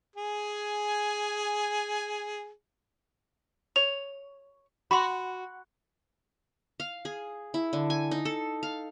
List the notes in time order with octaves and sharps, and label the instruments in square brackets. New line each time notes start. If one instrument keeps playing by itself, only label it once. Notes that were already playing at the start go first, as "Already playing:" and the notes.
[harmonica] G#4 G#5
[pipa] C#5 [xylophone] F7
[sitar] F#4 [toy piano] B5 C6
[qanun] F5
G#4
E4
D3
G#5
D#4
A4
F5